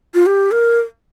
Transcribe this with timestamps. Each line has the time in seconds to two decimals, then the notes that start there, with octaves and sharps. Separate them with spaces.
0.14 F4
0.26 G4
0.51 A#4